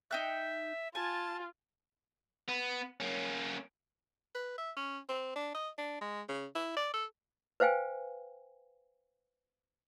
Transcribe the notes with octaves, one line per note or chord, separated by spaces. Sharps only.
D#4 E5 G5 F#6
F4 G#5 A5
B3
A#3 C#4
B4
E5
C#4
C4
D4
D#5
D4
G#3
C#3
E4
D5
A4
B4 C5 F5 G5 G#5